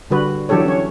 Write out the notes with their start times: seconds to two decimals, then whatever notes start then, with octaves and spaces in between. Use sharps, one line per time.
0.10 D3 G3 F#4 B4
0.49 E3 F#3 D4 G4 A4 C#5
0.65 C#4 C#5